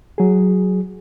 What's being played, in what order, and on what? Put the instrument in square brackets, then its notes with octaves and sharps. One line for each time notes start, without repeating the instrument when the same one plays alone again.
[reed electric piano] F#3 G#4